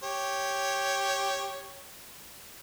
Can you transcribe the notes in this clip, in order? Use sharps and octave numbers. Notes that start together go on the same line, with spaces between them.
G4 C#5